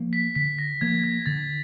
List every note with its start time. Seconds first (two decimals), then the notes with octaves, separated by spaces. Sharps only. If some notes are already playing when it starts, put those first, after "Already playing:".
Already playing: F3 A#3
0.13 B6
0.35 D3 B6
0.59 A#6
0.81 F3 A#3 G#6
1.04 G#6
1.26 D3 A6